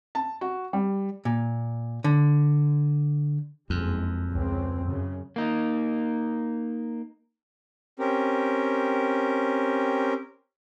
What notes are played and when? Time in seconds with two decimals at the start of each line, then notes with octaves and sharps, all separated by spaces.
0.15 A5
0.41 F#4
0.73 G3
1.25 A#2
2.04 D3
3.70 F#1 F2 G#3
4.30 C#2 C#3 C4
4.85 F#2 C#3
5.36 A#3 D#4
7.99 C4 C#4 G4 A#4